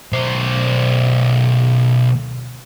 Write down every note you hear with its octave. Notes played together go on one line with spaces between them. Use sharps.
B1 C5